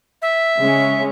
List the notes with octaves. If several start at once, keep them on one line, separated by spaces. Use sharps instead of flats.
E5
C#3 G#3 C#4